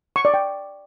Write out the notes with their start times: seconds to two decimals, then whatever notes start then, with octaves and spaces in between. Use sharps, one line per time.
0.16 C#6
0.25 D5
0.34 G5